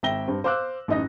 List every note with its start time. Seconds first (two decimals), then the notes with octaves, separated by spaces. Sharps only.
0.03 G#1 E5 G5 A#6 G7
0.28 G2 C4
0.44 C5 F5 D6 E6 F#6
0.88 A1 F#2 D#4 D#5 A#6